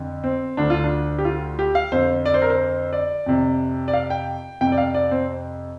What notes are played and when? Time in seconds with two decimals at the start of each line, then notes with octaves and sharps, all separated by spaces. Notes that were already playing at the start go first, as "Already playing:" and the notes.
Already playing: F2 D3
0.24 C4
0.57 D2 D3 D4
0.70 F4
0.84 D4
1.18 G4
1.25 F4
1.59 G4
1.75 F5
1.92 F2 D3 C5
2.26 D5
2.34 C5
2.42 A#4
2.50 C5
2.93 D5
3.26 F2 C3
3.88 D5
3.93 F5
4.10 G5
4.61 F2 C3 G5
4.72 D5
4.78 F5
4.94 D5
5.11 C4